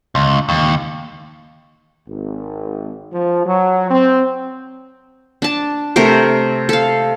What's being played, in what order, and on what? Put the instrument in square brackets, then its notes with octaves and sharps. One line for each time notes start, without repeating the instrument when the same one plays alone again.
[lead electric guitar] C#2
D#2
[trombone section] G#1
F3
F#3
C4
[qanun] D4 A5
C3 A3 A#4 C5
A4 F5